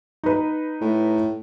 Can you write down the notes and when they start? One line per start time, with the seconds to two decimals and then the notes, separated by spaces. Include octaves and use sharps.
0.23 D#4 B4
0.81 A2